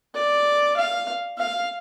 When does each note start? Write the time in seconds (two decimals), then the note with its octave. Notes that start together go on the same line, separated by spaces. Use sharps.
0.15 D5
0.77 F5
1.38 F5